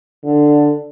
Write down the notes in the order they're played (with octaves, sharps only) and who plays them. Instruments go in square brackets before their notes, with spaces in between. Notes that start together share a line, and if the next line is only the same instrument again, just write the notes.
[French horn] D3